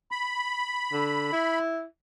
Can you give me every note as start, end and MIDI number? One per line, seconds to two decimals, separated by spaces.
0.11 1.59 83
0.92 1.31 50
1.32 1.84 64